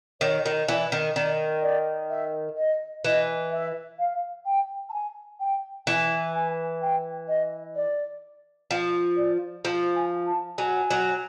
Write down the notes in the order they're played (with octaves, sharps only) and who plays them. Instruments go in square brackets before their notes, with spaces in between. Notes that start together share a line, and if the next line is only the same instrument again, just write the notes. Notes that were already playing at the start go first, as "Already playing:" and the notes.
[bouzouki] D#3 [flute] C#5
[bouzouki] D#3
[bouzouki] E3 [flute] D5
[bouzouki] D#3
[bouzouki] D#3 [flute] D5
[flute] D5
E5
D#5
[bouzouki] E3 [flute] D#5
[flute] E5
F5
G5
A5
G#5
G5
[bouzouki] E3 [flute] G#5
[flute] G#5
G5
D#5
D5
[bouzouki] F3
[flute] D5
[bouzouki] F3
[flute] G#5
A5
[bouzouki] F#3 [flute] G#5
[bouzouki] F#3